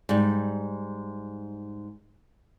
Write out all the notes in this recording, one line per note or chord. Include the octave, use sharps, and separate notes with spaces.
G#2 G3